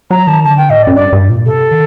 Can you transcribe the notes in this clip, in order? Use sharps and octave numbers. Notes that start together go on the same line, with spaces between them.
F#3 A#5
D#3 A5
D3 A5
G5
A2 D#5
D5
F#2
G2 D5
G2
A#2
C3 A4
D#3